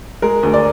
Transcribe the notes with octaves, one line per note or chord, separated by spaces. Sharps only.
G#3 A#4
D2
D5